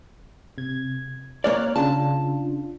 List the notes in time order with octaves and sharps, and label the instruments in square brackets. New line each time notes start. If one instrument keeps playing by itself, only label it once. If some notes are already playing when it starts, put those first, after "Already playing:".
[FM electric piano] C3 G#6
[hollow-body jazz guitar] A#3 C#5 D5 [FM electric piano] F6 F#6
[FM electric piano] C#3 D4 F4 [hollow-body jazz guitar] A5